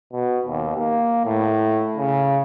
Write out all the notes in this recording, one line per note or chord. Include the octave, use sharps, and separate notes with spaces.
B2
D#2
A#3
A2
C#3